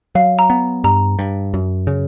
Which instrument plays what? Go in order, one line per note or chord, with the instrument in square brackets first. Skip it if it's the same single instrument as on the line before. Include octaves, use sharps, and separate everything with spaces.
[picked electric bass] F#3 [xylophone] F5
[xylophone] A#5
[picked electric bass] B3
[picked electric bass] G2 [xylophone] A#5
[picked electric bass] G2
F#2
C#3